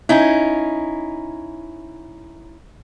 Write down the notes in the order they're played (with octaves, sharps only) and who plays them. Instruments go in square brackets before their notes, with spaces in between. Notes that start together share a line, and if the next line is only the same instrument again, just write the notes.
[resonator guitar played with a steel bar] C#4 D#4 E4